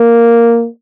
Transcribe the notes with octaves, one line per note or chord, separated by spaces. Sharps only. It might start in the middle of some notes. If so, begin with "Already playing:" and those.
Already playing: A#3